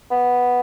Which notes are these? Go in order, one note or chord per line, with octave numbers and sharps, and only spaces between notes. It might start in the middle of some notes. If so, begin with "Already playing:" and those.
B3